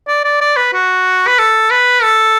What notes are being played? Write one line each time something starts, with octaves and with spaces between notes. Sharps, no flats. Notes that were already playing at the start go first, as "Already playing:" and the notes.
D5
D5
D5
B4
F#4
B4
A4
B4
A4